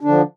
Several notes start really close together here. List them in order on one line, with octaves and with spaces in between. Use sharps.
D4 D3 F3